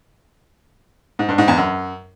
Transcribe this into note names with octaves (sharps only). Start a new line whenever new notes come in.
G#2
G2
G#2
E2
F#2